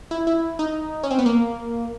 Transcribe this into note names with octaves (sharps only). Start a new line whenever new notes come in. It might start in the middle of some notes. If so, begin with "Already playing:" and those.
E4
E4
D#4
C#4
C4
B3
A#3